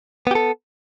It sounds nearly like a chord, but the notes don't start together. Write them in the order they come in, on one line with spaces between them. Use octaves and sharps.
B3 G4 A4